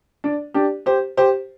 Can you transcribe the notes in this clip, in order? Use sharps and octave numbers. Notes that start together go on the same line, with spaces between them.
D4
D4 G4
G4 C5
G4 C5